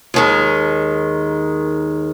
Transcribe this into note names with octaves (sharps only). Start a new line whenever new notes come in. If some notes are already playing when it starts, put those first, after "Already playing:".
D#2 D#3 G#3